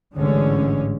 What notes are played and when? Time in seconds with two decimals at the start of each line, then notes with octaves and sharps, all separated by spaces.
0.16 A1 G#2 D3 G#3 C#4